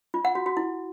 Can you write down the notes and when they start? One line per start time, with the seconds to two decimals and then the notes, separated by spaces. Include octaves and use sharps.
0.14 F4
0.25 F#5
0.35 F#4
0.46 F#4
0.57 E4